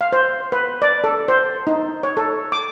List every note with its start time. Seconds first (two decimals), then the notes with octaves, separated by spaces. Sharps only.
0.01 F5
0.12 C5
0.52 B4
0.82 D5
1.04 A4
1.28 C5
1.67 D#4
2.03 C#5
2.17 A4
2.52 D6